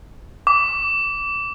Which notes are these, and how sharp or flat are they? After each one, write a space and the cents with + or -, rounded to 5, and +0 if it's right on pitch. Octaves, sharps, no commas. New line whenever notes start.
D6 -20